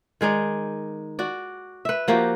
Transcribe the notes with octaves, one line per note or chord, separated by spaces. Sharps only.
D#3 G#3 D#4 D5
F#4 D5
B4 E5
F3 A#3 F#4 G4